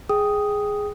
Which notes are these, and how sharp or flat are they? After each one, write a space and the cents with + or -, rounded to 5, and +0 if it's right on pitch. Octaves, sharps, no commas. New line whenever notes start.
G#4 +0 G5 +0 D#6 +0